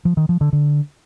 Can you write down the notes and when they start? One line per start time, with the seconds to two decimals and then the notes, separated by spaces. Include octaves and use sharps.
0.05 F3
0.17 D#3
0.29 F3
0.41 D3
0.53 D3